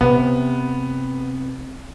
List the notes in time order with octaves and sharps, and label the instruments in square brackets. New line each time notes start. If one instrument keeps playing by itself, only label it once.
[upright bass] C3 [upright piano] B3